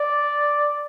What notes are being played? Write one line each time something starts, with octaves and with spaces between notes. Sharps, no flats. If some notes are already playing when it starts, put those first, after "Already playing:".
Already playing: D5